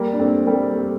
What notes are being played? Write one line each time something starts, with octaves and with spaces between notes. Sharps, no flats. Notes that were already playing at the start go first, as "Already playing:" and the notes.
Already playing: G3 A#3
D4
A3 C4
G3 A#3
A3